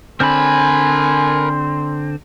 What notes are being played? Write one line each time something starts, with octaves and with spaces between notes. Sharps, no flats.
D3 C4 A#4 G#5 B5 C6